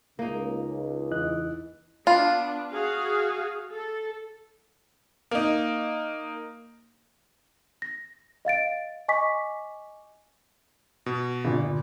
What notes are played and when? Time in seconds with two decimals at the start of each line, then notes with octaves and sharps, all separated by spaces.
0.19 C#2 A#3 D#4
1.11 E2 E3 D#5 F#6
2.07 B3 D4 F4
2.71 F#4 G#4 F5
3.71 A4
5.31 A#3 D#4
7.82 A#6
8.45 D#5 F5 A6 D7
9.08 D#5 G#5 C#6 D6 B6
11.06 B2
11.45 G1 A#2